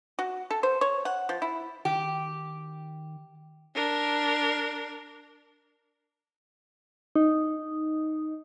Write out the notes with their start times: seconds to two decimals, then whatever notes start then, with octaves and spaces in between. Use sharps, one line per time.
0.19 F#4
0.51 A4
0.63 C5
0.81 C#5
1.05 F#5
1.29 F3
1.42 E4
1.85 D#3 G4
3.75 D4 A#4
7.16 D#4